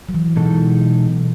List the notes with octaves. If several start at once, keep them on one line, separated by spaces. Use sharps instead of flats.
F#3
E3
B2 E3 G#3 D#4 A4